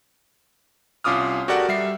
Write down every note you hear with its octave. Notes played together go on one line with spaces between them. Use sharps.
C2 C#4 F4 D6 D#6 F6
F#4 G4 A4 A#4 D5 F#5
G3 E5 C7